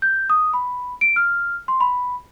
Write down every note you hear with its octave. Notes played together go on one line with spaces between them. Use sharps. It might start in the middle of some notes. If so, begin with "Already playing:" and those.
G6
D#6
B5
D7
F6
C6
B5